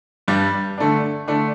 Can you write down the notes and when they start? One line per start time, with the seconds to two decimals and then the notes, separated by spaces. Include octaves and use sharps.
0.28 G2 G3 D4
0.78 D3 A3 D4
1.28 D3 A3 D4